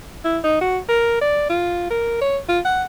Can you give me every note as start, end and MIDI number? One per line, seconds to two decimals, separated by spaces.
0.25 0.39 64
0.44 0.58 63
0.61 0.78 66
0.89 1.19 70
1.21 1.47 74
1.49 1.89 65
1.90 2.19 70
2.21 2.38 73
2.49 2.59 65
2.65 2.83 78